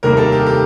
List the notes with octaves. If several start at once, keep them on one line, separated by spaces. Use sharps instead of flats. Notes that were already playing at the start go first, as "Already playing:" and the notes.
F1 D#2 D#3 G3 A#3 A#4
A4
G4
G4